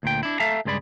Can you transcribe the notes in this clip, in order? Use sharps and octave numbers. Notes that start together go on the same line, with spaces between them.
D2 A#2 G5
D4 E4
A4 E5 F5 A5 A#5
C#2 G2 G#3 D5 B5